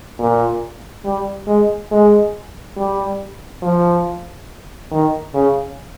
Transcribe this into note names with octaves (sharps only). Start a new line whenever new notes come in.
A#2
G3
G#3
G#3
G3
F3
D#3
C#3